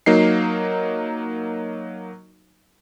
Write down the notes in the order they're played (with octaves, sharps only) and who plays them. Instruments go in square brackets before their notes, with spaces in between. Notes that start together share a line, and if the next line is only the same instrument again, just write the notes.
[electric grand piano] F#3 A#3 D#4 C7